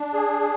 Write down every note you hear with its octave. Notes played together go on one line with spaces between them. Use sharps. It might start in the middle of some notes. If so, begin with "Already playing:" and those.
Already playing: D4
G#4